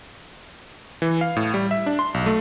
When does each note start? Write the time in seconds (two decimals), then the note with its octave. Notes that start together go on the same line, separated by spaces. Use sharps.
1.02 E3
1.21 F5
1.36 A2
1.54 G3
1.71 E5
1.86 D4
1.99 C6
2.14 B1
2.26 A3